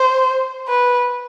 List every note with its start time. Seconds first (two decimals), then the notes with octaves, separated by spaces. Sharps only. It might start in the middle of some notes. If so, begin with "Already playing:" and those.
Already playing: C5
0.68 B4